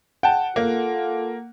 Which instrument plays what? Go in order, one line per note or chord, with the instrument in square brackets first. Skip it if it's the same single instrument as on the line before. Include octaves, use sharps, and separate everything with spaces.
[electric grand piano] F#5 [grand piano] G5 A5
[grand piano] A#3 [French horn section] F4 A4